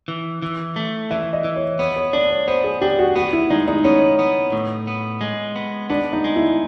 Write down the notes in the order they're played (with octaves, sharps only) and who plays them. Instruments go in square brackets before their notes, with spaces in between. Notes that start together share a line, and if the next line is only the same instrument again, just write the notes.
[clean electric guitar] E3
E3
A3
[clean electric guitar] E3 [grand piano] E5
[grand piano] D#5
[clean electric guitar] E3
[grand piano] C#5
[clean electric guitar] B3 [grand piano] C#5
[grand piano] C#5
[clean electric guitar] D4 [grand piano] D5
[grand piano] C#5
[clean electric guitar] B3 [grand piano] C5
[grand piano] G#4
[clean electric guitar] D4 [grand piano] G4
[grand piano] F#4
[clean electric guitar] B3 [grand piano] F#4
[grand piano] E4
[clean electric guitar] G#3 [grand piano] D#4
[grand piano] D#4
[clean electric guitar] B3 [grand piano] C#4
[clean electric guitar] B3
A2
B3
G#3
B3
[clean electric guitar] B3 [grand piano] D4
[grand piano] D#4
[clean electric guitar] G#3
[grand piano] E4